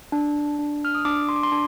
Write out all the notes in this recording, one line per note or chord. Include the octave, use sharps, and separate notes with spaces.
D4
D4
F6
D#6
D4 D6
C6
D6
C6
D4